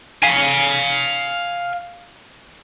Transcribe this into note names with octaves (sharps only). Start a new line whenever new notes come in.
F5 G#5